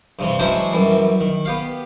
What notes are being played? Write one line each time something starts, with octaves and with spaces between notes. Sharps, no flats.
G2 C3 E3
E3 F#3 G#3 C#4 D4 C5
F#2 E3 G3
D#3
B3 G4 F5